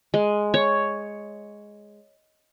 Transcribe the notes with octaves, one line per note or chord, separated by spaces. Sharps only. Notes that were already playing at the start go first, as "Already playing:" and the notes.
G#3
C#5